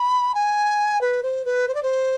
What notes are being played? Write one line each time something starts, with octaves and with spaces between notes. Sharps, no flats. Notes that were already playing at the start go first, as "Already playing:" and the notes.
Already playing: B5
G#5
B4
C5
B4
C5
D5
C5